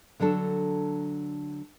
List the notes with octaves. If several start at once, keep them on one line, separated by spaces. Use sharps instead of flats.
D3 F#3 D4 A4